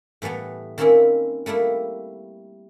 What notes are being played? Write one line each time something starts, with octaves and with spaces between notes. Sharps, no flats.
A2 E3 G3 A3 B3
D#3 A#3 C4 C#4 E4
G3 A3 A#3 E4